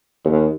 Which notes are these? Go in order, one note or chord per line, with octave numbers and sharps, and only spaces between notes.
D#2